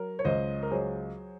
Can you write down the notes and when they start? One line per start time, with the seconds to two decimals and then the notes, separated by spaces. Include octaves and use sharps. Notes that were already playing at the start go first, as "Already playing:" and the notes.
Already playing: F#3 A#4
0.19 C#5
0.25 C#2 C5 D#5
0.63 A#4
0.71 F#3 G#4 C5